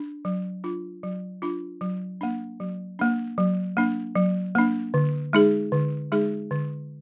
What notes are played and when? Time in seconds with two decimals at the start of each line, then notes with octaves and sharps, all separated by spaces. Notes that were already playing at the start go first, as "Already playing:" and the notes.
Already playing: D4
0.25 F#3
0.64 D4 F4
1.03 F#3
1.42 D4 F4
1.81 F#3
2.21 A#3 D4
2.60 F#3
2.99 A#3 D4
3.38 F#3
3.77 A#3 D4
4.15 F#3
4.55 A#3 D4
4.94 D3
5.33 G#3 D#4 G#4
5.72 D3
6.12 G#3 D#4 G#4
6.51 D3